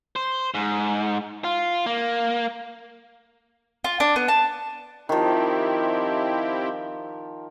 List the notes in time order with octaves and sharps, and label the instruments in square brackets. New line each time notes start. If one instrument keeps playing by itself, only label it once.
[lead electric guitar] C5
G#2
F4
A#3
[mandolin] F4
D4
B3
A5
[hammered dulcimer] D#3 F3 [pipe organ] C4 E4 G4